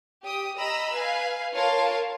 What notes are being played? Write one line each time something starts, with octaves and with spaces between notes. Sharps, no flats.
G4 D#6
D#5 A#5 B5 E6
B4 F5 G#5
F4 A#4 C#5 F5 A5